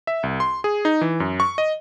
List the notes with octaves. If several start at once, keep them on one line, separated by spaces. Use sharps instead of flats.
E5
C2
C6
G#4
D#4
E3
F#2
C#6
D#5